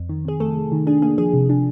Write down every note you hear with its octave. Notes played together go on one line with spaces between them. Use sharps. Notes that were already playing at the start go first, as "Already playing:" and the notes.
Already playing: F2
D#3
C3 G#4
F2 A3 A4
F2
D#3
D4 G#4
A#3 G#4
F3 G#4
C3
D4